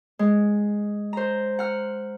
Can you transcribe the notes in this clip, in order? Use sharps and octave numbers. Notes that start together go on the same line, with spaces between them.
G#3
C5 A#5
F#5 F6